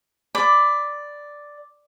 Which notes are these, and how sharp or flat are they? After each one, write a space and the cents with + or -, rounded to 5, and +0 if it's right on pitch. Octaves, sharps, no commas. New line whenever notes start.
D5 +0 B5 +15